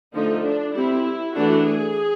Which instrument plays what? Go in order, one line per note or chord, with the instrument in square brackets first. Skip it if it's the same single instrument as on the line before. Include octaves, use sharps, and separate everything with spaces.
[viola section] D3 F3 A3 D#4
D4
G3 C4 E4
E3 A3 D4 F#4
G#4